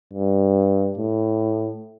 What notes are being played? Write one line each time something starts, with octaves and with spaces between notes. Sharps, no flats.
G2
A2